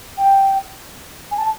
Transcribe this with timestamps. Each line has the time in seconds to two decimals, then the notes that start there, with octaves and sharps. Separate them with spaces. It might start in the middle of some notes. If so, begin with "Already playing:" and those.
0.18 G5
1.31 G#5
1.37 A5